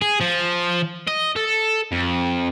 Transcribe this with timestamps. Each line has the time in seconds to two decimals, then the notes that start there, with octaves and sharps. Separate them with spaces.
0.02 G#4
0.20 F3
1.07 D#5
1.36 A4
1.92 F2